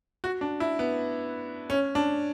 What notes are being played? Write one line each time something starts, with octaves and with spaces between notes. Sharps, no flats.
F#4
D4
E4
B3
C#4
D4